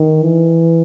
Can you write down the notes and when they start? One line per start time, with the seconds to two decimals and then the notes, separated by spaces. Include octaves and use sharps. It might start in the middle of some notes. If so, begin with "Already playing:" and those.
Already playing: D#3
0.23 E3